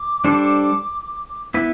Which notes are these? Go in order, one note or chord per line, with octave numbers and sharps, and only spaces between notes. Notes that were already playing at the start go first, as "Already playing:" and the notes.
Already playing: D6
G3 D4 A4 C5
B3 E4 B4